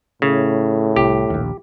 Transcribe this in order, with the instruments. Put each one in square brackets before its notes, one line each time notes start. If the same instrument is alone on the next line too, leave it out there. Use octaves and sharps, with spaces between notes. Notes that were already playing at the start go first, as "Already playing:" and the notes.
[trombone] A2 [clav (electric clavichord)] C#3
[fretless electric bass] C2 [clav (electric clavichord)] G4
[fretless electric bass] A#1 D#2